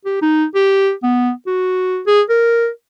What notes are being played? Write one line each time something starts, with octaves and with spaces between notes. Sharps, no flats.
G4
D#4
G4
B3
F#4
G#4
A#4